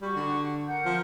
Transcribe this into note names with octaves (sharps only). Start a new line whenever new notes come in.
G3 F#4 C#6
D3
A#4 F#5 G6
F3